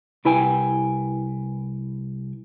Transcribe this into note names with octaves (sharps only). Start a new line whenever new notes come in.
C2 E4 B4 G5 G#5